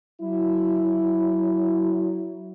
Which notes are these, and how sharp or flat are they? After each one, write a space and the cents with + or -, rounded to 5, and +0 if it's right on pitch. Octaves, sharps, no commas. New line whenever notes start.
F#3 +15 E4 +0